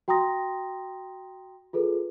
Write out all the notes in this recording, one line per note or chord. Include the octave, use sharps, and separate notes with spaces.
F#4 G5 A#5 C6 D#6 A#6
F4 G#4 A4 B4